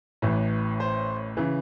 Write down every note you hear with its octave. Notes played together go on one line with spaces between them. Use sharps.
A1 A2 E3
C5
C#3 E3